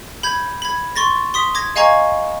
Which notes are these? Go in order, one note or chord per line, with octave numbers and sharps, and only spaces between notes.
B5 G6 G#6
B5 G#6
C6 C#6 A6 A#6
C6 D#6 B6
D6 G#6 A#6
D#5 F5 G#5 A#5 C#6 G#6